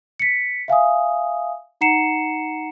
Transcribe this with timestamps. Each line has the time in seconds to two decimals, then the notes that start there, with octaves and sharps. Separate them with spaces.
0.20 B6 C#7
0.68 E5 F5 G#5 D#6
1.81 D#4 F#5 A#5 C7 C#7 E7